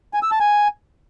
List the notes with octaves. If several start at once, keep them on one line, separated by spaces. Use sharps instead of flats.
G#5
E6
A5
G#5